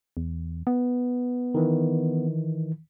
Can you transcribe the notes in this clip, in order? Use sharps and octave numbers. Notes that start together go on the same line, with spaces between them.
E2
B3
D#3 E3